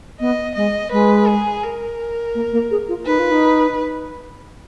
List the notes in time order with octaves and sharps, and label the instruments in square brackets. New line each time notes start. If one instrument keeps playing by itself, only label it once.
[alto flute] B3 [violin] D#5
[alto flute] G#3 [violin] D#5
[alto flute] G#3 [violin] B4
[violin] G#4
A#4
[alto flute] A#3
A#3
G#4
F4
[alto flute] D#4 [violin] B4
[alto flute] F4
D#4